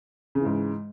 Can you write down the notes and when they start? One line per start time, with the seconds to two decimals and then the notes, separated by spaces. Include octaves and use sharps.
0.35 C#3
0.40 E3
0.45 G#2